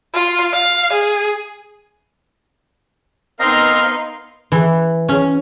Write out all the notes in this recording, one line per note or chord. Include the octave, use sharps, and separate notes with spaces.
F4
F5
G#4
B3 C4 D#4 A#4 D#5 F5 A#5 C6
E3
C#4